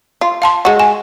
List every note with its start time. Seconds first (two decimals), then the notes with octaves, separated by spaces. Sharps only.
0.21 F4
0.42 F5 A5 C6
0.65 G#3 F#4
0.80 G#5